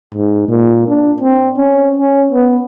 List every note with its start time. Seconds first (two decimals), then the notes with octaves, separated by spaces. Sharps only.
0.14 G#2
0.48 A#2
0.87 D4
1.21 C4
1.57 C#4
1.96 C#4
2.32 B3